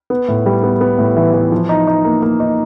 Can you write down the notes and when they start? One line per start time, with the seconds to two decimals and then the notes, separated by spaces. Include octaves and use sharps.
0.10 B3
0.28 A2
0.46 G3
0.63 B3
0.81 B3
0.99 A2
1.17 E3
1.34 E3
1.52 F3
1.69 D#4
1.87 D#4
2.05 A#3
2.22 A#3
2.40 D#4